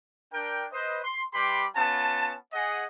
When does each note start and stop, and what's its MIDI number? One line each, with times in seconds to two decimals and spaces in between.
0.32 0.65 62
0.32 0.65 70
0.32 0.65 79
0.72 1.00 71
0.72 1.00 72
0.72 1.00 75
1.04 1.22 84
1.33 1.65 55
1.33 1.65 67
1.33 1.65 71
1.33 1.65 83
1.33 1.65 84
1.33 1.65 86
1.75 2.34 59
1.75 2.34 61
1.75 2.34 65
1.75 2.34 81
2.53 2.85 68
2.53 2.85 75
2.53 2.85 78